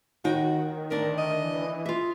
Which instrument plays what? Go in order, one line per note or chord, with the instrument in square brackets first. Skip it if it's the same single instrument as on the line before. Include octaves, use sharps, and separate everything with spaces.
[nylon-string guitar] D#2 D#4 G5 [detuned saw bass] D#3 [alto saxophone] F#4
[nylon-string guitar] D2 D4 E5 [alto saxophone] A#4
[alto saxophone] D#5
[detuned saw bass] E3
[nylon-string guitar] F4 E5